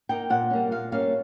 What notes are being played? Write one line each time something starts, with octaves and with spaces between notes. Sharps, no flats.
A#3 D#4 G5
A#2 F#5
C#4
G3 A#3
A#2 F5
G3 A#3 C#4 F5